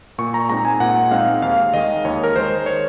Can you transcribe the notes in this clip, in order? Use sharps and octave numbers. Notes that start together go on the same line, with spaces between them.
A#2 C#6
A#5
G#3 C4 D#4 A#5
G#5
A#2 F#5
G#3 C4 D#4 F5
D#2 F5
D#3 G#3 D#5
D#2 C#5
A#4
D#3 G#3 C5
C#5